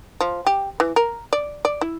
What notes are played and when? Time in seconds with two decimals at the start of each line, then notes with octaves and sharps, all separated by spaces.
0.20 F3
0.46 G4
0.80 E3
0.96 A#4
1.33 D5
1.65 D5
1.81 E4